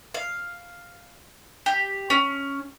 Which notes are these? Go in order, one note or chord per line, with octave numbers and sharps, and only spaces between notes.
F5
G4
C#4